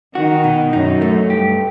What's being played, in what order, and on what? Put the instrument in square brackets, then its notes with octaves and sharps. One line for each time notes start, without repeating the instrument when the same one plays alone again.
[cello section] D#3 [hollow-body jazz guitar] F#4
[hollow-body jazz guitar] B2
[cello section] F#2 [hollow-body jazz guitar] D#4
[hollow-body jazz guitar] A3
[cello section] G2 [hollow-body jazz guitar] G4